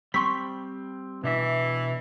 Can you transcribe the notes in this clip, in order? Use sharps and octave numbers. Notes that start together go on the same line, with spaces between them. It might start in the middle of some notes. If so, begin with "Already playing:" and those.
G3 C4 C6 C#6 B6
B2 E3 D4 E5